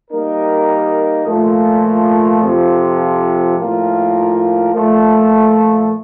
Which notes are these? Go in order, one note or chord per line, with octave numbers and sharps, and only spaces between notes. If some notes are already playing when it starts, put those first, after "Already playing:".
G3 A#3 D#4 A#4
A#2 F3 A3
F2 C3 F3
A2 F3 A#3 F4 A#4
A#2 F3 A3